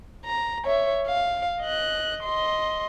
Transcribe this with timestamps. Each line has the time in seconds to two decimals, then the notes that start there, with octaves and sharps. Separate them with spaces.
0.25 A#5
0.65 C#5 E5
1.07 F5
1.61 D#5 F#6
2.23 D#5 C6